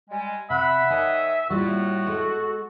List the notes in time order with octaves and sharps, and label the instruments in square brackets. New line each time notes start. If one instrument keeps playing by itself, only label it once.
[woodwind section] G3 G#3 [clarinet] G#5
[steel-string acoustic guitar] C3 [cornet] E5 [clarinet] F#5 [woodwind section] B5
[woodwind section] D#3 C#5 D#5 [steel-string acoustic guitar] G#5
[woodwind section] A2 [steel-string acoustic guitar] G3 F4 [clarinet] A#3 [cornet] F#4
[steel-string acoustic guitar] G#3 [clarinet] A4